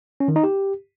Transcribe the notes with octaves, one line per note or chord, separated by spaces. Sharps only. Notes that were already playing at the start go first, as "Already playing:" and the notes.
C#4
D#3
D#4
G4